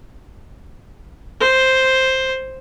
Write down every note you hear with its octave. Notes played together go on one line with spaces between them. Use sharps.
C5